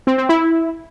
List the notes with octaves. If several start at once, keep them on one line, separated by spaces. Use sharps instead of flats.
C4
C4
E4